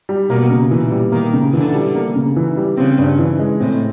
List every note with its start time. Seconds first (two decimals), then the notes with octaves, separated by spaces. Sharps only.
0.09 G3
0.29 B2 A#3
0.50 C#3
0.71 A#2 E3
0.91 G3
1.12 D#3 A#3
1.33 C#3
1.53 D3 E3
1.74 G3
1.95 A#3
2.16 C#3
2.36 E3
2.57 G3
2.77 C#3 C4
2.98 G2
3.19 E3
3.39 G#3
3.60 A2 C4